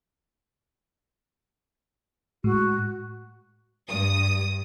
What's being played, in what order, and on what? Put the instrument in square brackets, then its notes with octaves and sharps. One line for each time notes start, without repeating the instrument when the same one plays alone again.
[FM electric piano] A2 G#3 [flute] F#4
[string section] G2 D#6